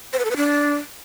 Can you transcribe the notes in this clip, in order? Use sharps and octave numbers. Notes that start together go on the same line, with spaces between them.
C5
B4
A4
B4
D4